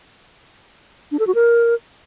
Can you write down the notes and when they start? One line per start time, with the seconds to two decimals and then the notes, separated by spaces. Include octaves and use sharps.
1.12 D4
1.19 A4
1.27 F#4
1.35 A#4